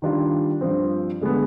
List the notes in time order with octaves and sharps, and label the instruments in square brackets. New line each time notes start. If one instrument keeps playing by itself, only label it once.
[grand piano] D#3 G3 D4 F4
G2 F3 C4
D3 G#3 B3